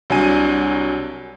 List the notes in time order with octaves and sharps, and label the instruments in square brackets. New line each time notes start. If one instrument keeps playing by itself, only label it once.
[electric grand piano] C2 F#3 D4 G#5 D#7